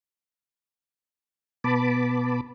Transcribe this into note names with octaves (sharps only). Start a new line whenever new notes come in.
B2 B3 A5 B5 D6